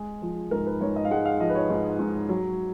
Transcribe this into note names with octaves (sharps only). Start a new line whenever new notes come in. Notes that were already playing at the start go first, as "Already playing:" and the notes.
Already playing: G#3 G#4
F3
G#2 A#4
B4
G#2 C#5
D#5
F5
G#3 F#5
F5
F3 D#5
B4
C#5
G#2
G#2
F#3